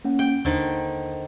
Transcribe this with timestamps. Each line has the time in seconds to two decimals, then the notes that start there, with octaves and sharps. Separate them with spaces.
0.05 A#3 C#4 F#5
0.19 G5
0.45 D#2 D3 D#3 C5